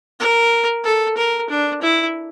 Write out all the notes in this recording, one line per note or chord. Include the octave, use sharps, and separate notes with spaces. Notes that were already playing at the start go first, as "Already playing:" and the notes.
A#4
A4
A#4
D4
E4